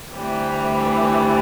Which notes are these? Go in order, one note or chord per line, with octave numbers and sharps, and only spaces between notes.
D2 C3 E3 G3